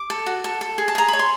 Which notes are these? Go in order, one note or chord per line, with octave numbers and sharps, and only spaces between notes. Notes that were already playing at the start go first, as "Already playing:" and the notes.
Already playing: D6
A4
F#4
A4
A4
G#4
A5
G#4 A#5
C#5 B5
C6